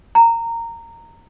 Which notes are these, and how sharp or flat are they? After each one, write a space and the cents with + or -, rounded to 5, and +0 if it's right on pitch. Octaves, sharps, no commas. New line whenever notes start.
A#5 -15